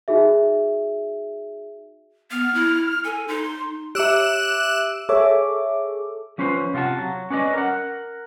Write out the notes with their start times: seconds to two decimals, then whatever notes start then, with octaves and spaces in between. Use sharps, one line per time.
0.08 D#4 F#4 G#4 E5
2.31 B3 F6
2.54 E4
3.05 A4 G#5
3.28 D#4 C6
3.95 G4 E5 D6 E6 F#6 D7 E7
5.09 G#4 A4 C#5 E5 D6
6.38 F3 C#4 B4 C5
6.74 C3 F4 F#4 F#5 A5
6.99 F#3
7.30 C#4 B4 D5 D#5
7.53 A#4 F#5